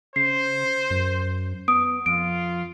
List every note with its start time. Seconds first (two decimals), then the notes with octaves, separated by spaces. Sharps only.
0.16 C#3 C5 C7
0.91 F#2
1.68 B3 D#6 D7
2.06 F2 F4 D7